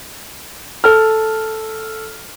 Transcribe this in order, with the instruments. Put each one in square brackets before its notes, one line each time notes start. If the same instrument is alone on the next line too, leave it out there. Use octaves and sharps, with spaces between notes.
[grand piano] A4 F6